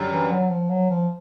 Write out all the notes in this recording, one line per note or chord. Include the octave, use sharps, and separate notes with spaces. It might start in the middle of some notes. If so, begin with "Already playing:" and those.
Already playing: F#2 D3 G3
E3
F#3
F3
F#3
F3